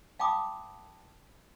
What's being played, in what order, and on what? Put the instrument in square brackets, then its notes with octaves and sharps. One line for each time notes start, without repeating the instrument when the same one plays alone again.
[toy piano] F5 G5 A5 B5 D6 D#6